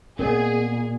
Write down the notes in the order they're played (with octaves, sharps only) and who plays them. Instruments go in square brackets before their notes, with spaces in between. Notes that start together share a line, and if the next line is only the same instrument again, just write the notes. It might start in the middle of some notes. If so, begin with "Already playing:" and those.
[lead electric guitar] A#2 [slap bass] B3 C4 [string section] G#4 [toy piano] A#4 C#5 D#5